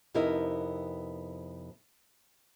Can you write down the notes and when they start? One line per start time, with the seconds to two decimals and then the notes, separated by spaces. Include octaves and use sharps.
0.14 F2 C3 B3 D#4 E4 A#4